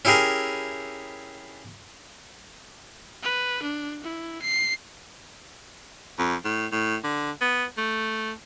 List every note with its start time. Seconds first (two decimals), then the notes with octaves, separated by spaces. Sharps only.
0.05 C#4 E4 G4 G#4 A#4
3.23 B4
3.63 D4
4.03 E4
4.42 C7
6.18 F2
6.45 A2
6.72 A2
7.04 D3
7.41 B3
7.77 A3